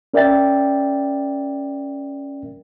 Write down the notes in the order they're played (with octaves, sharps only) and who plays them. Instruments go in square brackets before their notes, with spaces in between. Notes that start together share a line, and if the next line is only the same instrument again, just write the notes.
[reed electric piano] C#4 A#4 D5 E5 G5 A6